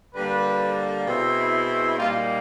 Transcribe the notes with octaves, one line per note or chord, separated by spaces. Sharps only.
D3 G3 A#3 B4
B2 G#3 C4 E4
A#2 G3 A#3 D#4 F4